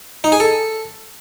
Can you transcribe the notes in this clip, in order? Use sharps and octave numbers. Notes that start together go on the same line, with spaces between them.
D#4
G#4
A4